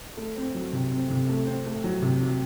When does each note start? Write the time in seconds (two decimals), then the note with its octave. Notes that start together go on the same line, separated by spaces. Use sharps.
0.17 A3
0.37 C4
0.55 F#3
0.73 C3
0.91 C4
1.09 C3
1.29 A3
1.47 C4
1.66 A3
1.84 F#3
2.02 C3
2.21 F#3